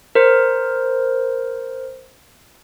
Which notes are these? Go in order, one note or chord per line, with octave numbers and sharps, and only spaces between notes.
A#4 C5